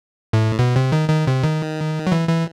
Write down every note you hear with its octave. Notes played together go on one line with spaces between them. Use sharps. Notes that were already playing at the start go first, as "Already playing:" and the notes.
A2
B2
C3
D#3
D#3
C3
D#3
F#3
E3
E3